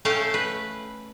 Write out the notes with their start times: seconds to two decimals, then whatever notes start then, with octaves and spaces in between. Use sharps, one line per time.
0.05 A3 C#4 F5 G5 A5
0.34 B4